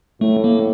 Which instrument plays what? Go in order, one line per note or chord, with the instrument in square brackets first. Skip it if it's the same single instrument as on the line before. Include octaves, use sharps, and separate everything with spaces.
[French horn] A2 [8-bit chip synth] A3
[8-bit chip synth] A#3